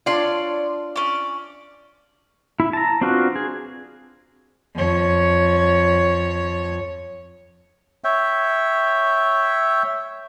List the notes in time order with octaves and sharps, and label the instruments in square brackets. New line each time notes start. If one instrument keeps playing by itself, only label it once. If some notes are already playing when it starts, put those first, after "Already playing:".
[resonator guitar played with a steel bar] D4 F4 [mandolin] C#5 D5 C6
[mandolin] C#4 D5
[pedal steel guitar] E4
A5 A#5
C4 D4 F4 F#4 B4
G#4
[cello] F2 C#5
[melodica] C#5 E5 G5